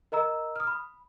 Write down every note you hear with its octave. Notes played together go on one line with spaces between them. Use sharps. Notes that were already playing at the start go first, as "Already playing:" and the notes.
A#4 D#5 A#5 E6
D#6 F6
B5